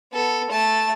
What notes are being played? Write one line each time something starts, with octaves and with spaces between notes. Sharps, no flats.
B3 A4
A3 A5